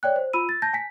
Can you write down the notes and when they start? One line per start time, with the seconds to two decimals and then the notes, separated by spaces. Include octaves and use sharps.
0.03 C#5 D5 G5 F#6
0.16 C5
0.33 F4 B5 E6 D#7
0.49 A6
0.62 A5 G6 A#6
0.73 G#5 B6